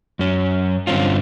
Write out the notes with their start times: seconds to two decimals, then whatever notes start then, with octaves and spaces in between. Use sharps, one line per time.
0.19 F#2 C#4
0.87 G2 D3 C4 C#4 F4